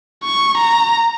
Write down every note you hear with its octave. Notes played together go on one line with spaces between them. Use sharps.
C#6
A#5